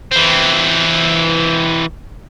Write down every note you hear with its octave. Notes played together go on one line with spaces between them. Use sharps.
E3 C4